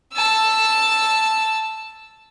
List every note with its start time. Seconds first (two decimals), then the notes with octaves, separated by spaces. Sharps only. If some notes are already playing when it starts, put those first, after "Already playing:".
0.13 A5 E6